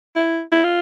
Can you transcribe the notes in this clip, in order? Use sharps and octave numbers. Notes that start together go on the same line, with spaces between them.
E4
E4
F4